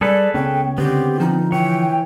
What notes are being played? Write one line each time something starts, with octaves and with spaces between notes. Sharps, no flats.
G3 G#4 A4 B4 D5
C#2 B3 C#4 G5
D3 B3 C4 G4
F3 D#4
E3 C#5 G5